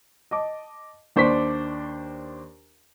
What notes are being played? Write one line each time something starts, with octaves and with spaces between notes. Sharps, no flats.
D#5 A5 D6
D#2 D4 C5 D5 C#6 B6